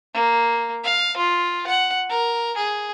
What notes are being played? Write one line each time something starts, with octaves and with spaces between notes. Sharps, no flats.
A#3
F5
F4
F#5
A#4
G#4